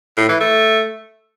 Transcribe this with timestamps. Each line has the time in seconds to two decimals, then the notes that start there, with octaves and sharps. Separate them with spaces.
0.17 A2
0.29 E3
0.40 A3